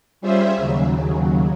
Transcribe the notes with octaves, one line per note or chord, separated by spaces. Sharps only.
G3 C#4 F4 G#4 C5 E5
D#2 C#3 F#3